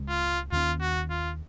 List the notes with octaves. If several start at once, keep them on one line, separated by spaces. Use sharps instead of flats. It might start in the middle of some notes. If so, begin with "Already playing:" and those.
Already playing: C#2 C#3 G#3
F4
D#2 D#3 A#3 C#4 F4
F#4
F4